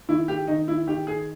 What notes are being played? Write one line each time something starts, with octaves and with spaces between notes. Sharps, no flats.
D#3 E4
G4
D#3 D#4
E4
D#3 G4
G#4